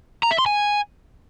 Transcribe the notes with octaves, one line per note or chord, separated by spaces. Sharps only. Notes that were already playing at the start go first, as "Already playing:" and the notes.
A#5
E5
C6
G#5